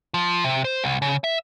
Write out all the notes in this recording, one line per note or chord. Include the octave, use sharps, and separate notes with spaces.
F3
C3
C5
C2
C#3
E5